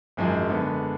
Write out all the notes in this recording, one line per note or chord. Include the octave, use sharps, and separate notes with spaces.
G#1 F#2 F3 G#3
D3 G#3 B3